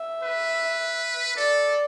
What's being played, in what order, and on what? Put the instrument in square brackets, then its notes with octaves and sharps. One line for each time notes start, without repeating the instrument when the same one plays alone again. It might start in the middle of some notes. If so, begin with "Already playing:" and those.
Already playing: [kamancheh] E5
[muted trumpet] B4
[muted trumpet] A4 [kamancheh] D5